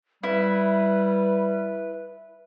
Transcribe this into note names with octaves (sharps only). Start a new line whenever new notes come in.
G3 E4 B4